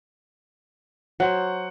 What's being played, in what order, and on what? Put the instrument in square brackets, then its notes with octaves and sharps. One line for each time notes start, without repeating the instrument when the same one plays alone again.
[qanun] F#3 [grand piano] C5 F#5